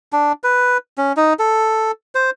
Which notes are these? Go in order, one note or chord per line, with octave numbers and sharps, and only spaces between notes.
D4
B4
C#4
D#4
A4
C5